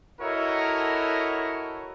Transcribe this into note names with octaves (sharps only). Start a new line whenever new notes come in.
E4 F#4 A4 A#4 C#5 D#5